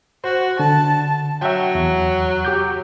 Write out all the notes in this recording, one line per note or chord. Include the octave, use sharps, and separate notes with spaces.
F#4 C5
D3 A5
F#3 E5 G5
E2
G4 D6 G6